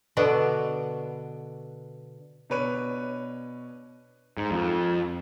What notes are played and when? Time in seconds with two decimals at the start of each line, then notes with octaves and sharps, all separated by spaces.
0.17 B2 D3 B3 D4
2.50 B2 D4 B4 C#5 D#7
4.37 G#2
4.51 F2